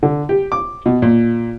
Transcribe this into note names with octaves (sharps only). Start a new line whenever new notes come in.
D3
G4
D6
B2
A#2